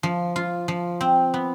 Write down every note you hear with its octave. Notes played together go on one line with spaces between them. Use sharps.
F3
F4
F3
C4
B3